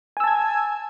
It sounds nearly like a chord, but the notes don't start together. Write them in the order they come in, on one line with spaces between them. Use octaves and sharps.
G#5 E6 A5 G#6